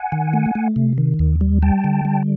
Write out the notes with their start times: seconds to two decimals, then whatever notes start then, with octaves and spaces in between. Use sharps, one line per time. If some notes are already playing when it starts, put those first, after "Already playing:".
Already playing: F#5 G#5
0.12 D#3
0.33 A3
0.55 A3
0.76 C3
0.98 D#3
1.19 D#2
1.41 G3
1.62 G3 G5 A5
1.84 D3
2.05 G3